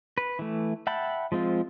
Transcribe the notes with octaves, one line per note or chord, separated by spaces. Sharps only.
B4
E3 A3
E5 F#5 G5 A5 B5
F3 G#3 C4 F4